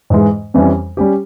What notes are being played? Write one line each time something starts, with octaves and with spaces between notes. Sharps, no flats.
G#2 E3 G#3
F2 E3 G3 C#4
G3 C#4 G4